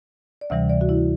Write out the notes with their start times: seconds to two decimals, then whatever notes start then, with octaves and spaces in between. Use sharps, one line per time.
0.41 D5
0.50 D2 C3 E3 G3 E5
0.69 D5
0.81 F#4
0.89 E4